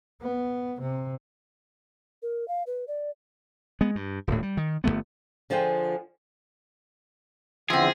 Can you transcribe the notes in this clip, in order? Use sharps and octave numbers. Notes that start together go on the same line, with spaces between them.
B3
C3
A#4
F5
B4
D5
G#3 B3
G2
D#1 D2 A2
G3
D#3
G1 A2 A3 B3
D3 F3 F4 G#4 G5
E2 D3 F3 C4 G#4 E5